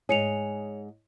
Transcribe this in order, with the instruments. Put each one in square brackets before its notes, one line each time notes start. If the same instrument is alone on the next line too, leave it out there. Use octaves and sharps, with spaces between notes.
[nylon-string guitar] G#2 G#4 [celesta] C#5 C#7 F7